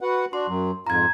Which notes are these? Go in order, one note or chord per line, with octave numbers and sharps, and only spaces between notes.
F#4 B4 F#5
D4 F#4 C6
F#2 F#3
F2 G#2 F4 A#5 G#6